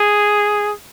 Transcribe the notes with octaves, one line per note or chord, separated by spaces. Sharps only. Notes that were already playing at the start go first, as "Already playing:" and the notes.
Already playing: G#4